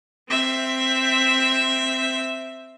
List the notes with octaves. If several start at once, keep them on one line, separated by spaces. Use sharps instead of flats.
C4 E5